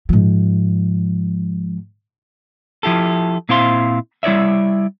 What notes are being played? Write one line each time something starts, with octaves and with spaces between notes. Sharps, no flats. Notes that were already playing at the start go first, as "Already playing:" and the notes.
G#2 F3
F3 E4 G4 A4
A#2 C4 E4 C5 F5 C6
G3 E4 C#5 D5 E5